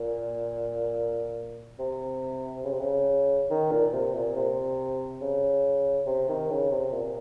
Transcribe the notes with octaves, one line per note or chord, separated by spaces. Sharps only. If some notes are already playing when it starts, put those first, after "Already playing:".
Already playing: A#2
C3
C#3
C3
C#3
D#3
A#2
C3
A#2
C3
C#3
C3
D#3
C#3
C3
A#2